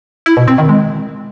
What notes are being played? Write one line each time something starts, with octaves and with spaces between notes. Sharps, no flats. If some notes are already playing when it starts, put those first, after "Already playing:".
E4
B2
C4
D#3
G#3